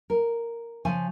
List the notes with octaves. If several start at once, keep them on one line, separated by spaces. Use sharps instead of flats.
A#4
C#3 F3 G#5